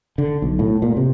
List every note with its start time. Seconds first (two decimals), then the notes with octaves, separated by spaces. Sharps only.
0.18 D3
0.42 B1
0.59 A2
0.82 A#2
0.97 C3